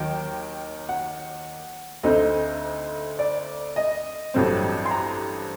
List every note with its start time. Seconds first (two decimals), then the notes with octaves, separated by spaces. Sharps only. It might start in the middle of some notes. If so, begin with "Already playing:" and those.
Already playing: D#2 D#3 F#3 G5
0.89 F#5
2.03 D2 D3 A3 C4 D#4 D#5
3.19 D5
3.76 D#5
4.34 A1 G2 F#3 A3 C4
4.85 C6
4.91 A#5